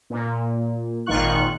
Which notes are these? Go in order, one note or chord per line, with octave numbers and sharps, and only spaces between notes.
A#2
G#1 A#2 D#3 F4 C#6 F#6